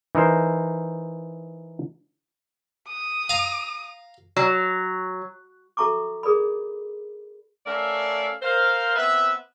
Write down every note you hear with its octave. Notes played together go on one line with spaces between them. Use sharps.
E3 D#4 A#4 C5
D#6
F5 A#5
F#3
F#4 A4 E5 A#5 C#6 D6
G#4 A#4 D5 B5
A3 C#4 A#4 D5 E5 F5
A#4 C5 F5
B3 C4 B4 E5